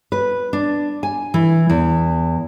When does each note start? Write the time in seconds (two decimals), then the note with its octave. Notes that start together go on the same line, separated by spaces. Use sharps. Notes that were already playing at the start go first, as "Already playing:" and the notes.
0.12 B4
0.53 D4
1.03 G#5
1.34 E3
1.70 E2